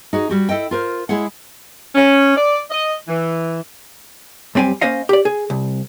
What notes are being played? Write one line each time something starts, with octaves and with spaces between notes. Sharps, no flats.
D#4 F#4 G#4
G3 F#4 G4
E4 A4 D#5 G5
F4 A#4 C5
G#3 E4 G#4 C#5 F#5
C#4
D5
D#5
E3
F#2 G3 C4 G4 G#5
A#3 C#4 C5 D#5 F5
G4 D5
G#4
C2